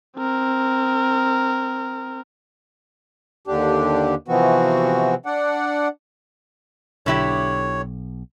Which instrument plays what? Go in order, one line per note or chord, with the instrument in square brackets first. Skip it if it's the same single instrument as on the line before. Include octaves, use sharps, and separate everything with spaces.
[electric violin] C4 A#4
[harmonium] D#2 D3 D4 G4
C3 E3 F3 B3 C4 F#4
D4 D5 F#5
[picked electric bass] B1 [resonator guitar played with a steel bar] D3 E4 G4 [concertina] C#5